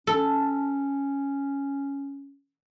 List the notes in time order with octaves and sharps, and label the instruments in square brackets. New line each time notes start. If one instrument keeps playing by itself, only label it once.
[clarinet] C#4 [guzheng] A4